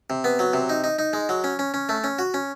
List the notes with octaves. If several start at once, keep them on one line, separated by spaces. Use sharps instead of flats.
C3
B3
F#3
C3
D#4
D#4
D#4
G#3
F#3
C#4
C#4
C#4
A3
C#4
F#4
C#4